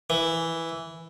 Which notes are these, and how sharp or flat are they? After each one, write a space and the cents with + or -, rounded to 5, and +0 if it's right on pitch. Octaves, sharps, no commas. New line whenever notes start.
E3 +0